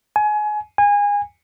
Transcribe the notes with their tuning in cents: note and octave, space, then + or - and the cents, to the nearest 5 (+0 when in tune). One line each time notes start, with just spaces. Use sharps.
G#5 +25
G#5 -25